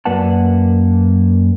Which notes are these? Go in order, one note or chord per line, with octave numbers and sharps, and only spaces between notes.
F#2 A#3 B4 D5 F#5 A5